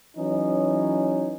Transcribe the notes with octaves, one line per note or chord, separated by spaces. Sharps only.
E3 F#3 C#4 D#4